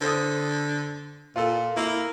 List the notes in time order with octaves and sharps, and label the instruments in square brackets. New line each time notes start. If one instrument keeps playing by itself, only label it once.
[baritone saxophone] D3 [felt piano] A4 C5 D#6
[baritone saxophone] A#2 [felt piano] F4 A4
[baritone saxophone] A#3 [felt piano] E4